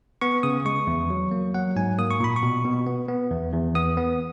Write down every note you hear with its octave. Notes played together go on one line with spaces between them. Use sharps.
B3 C#6
C#3 D#6
G#3 C#6
E2
F#3
A#3
F#3 F#5
G#2 G#5
A#3 D#6
C#6
A#2 B5
C#6
B2
B2
B3
B3
E2
E2
B3 D#6
B3